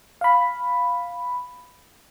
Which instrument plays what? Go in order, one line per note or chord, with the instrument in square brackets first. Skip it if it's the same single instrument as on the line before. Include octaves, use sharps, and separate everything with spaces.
[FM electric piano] F5 B5